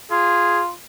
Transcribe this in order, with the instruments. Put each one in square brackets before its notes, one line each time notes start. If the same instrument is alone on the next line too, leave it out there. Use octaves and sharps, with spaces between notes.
[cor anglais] F4 [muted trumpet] G#4